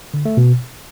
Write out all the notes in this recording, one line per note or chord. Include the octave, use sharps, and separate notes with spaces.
D3
A3
B2